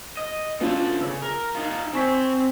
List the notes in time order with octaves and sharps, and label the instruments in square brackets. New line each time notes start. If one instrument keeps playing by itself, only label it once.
[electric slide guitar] D#5
[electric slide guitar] A3 D4 A4 [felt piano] B3 C#4 F4
[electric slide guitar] C#3 [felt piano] E6
[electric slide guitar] A#4
D#4 F4
[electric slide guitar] C4 [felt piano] G#5 C#6 B6